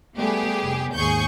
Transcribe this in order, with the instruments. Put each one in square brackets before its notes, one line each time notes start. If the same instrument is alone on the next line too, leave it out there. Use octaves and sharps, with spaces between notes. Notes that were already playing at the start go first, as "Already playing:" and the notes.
[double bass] G3 A3 [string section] B3 G4 G#4
[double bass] F1
[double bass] D#2 G#2 [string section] G#4 C#6 G6